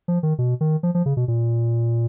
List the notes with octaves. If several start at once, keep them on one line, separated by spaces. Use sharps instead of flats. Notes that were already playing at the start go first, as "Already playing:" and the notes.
F3
D#3
B2
D#3
F3
F3
C#3
B2
A#2